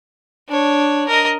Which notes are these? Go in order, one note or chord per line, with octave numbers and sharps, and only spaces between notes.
D4 C#5
A#4 D#5